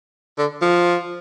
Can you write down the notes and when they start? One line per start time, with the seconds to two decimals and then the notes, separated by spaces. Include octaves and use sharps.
0.38 D3
0.61 F3